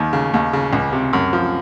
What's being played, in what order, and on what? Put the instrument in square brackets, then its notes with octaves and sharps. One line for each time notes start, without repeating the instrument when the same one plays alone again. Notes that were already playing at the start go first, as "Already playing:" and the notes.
Already playing: [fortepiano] D#2 D#3
C#3
D#2
C#3
C#2
C3
F#2
F3